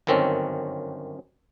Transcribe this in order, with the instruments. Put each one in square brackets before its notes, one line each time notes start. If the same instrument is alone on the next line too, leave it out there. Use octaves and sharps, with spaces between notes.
[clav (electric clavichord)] G1 F#2 D#3 C4 C#4 A4